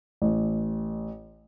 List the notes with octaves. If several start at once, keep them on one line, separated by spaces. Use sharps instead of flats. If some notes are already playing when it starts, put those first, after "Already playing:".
A1